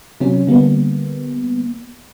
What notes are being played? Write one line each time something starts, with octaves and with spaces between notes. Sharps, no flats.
C3 F#3 C#4
D3 G3 A#3 B3